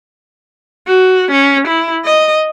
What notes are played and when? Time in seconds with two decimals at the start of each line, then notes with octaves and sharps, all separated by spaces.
0.87 F#4
1.31 C#4
1.67 E4
2.06 D#5